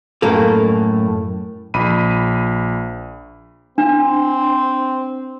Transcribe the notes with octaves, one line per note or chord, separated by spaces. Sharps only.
F#2 A2 A#3 A4
A#1 B5 D#7
C4 D4